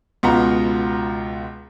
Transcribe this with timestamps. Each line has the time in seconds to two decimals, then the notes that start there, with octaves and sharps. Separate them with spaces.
0.23 C#2 B2 B3 F4 A#5